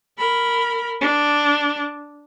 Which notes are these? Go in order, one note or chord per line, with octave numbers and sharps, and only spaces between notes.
A#4 B5
D4